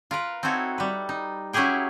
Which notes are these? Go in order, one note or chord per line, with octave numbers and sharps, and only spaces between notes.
F4 A#4 B4
C4 D#4 E4 F#4 A4 C#5
G3 B4
D#4
F#3 C#4 E4 G4 G#4 G5